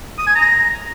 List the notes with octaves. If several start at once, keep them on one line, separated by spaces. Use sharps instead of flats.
D#6
G#5
A#5